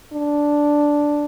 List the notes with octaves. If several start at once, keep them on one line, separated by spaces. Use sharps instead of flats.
D4